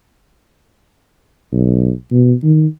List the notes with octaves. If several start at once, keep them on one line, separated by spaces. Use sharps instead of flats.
B1
B2
D#3